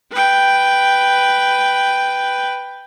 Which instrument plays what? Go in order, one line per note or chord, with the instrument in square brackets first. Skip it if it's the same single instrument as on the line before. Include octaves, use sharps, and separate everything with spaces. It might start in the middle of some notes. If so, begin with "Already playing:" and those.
[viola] B4 G5